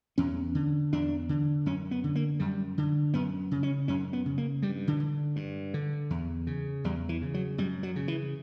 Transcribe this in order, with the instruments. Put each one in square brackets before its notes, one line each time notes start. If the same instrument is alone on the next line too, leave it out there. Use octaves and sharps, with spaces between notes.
[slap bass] E2 C#4
D3
E2 D4
D3
F#2 C#4
B3
D3
A#3
F#2 G3
D3
F#2 B3
C#3
C#4
F#2 C#4
B3
C#3
A#3
G2 G3
D3
D3
G2
D3
E2
C#3
E2 G3
E3
C#3
F#3
F#2 G3
F#3
C#3
E3